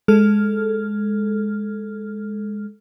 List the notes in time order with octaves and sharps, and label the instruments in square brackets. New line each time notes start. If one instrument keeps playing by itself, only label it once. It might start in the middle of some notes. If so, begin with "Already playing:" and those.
[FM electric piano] G#3 A4 F6